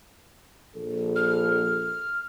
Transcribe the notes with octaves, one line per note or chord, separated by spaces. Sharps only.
A#1 A4
F6